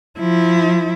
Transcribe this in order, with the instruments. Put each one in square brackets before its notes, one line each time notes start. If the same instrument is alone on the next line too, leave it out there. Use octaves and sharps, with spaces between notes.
[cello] F3 E4